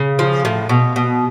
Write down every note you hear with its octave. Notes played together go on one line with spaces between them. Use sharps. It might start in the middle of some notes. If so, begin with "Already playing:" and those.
Already playing: C#3
F3
A2
B2
B2